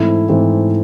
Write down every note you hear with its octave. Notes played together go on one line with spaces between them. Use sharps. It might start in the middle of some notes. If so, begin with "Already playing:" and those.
Already playing: G#2 E3 A3 C4 E4
G#2 E3 A3 C4 E4